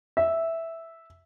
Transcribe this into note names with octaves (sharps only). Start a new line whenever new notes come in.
E5